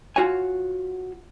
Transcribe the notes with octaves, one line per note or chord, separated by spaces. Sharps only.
F4 F#4 C#5 G#5